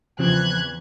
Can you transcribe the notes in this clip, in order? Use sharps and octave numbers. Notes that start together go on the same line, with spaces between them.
E2 C#3 E3 F3 C4 F#6 G#6